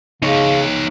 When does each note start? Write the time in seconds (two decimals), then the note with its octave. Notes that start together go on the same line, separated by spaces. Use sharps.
0.22 C#3 D#4 C#5